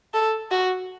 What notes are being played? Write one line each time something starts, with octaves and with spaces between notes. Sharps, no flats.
A4
F#4